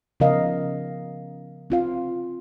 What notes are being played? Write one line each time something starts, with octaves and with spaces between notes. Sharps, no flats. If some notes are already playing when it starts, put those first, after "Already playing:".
C#3 F3 B3 A#4 D#5 F5
C4 F4 F5